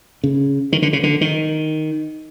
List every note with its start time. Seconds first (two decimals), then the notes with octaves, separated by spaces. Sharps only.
0.24 C#3
0.72 D#3
0.82 D3
0.93 C#3
1.03 D3
1.21 D#3